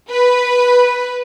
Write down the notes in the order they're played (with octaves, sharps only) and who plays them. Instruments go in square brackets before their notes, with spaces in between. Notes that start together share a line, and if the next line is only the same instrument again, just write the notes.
[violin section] B4